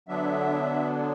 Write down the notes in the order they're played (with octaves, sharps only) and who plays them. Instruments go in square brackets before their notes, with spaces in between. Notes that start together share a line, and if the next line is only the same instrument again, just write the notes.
[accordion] D3 F#3 B3 D4 E5